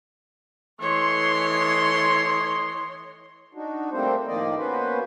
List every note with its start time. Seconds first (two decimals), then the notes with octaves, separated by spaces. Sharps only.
0.80 E3 A3 C#5 D#5 C6
3.54 D4 D#4 F#4
3.92 G3 A3 A#3 C4 C5
4.27 A2 D#3 F3 A#3 D5 D#5
4.57 A#3 B3 C#4 F#4 B4 C5